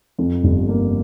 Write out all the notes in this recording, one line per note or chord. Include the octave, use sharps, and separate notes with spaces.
F2
G1
A#3